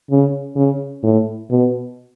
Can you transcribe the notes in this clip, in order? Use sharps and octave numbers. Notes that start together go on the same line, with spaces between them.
C#3
C#3
A2
B2